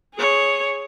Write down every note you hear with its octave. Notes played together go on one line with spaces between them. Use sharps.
G#4 C#5